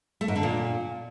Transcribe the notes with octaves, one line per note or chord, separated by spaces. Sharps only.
A3
G#2
D3
A#2